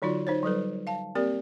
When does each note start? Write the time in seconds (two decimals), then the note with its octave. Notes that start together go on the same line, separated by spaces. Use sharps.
0.02 D3 F#3 D#4 F4 F#4 D5
0.27 D#4 C5 C#5
0.43 F#3 G3 A4 B4
0.87 F5 A5
1.15 A#3 C4 G4 A#4 D5